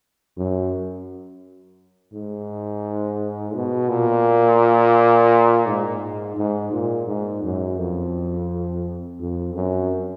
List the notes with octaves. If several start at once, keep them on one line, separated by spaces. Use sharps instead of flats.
F#2
G#2
B2
A#2
G#2
G#2
A#2
G#2
F#2
F2
F2
F#2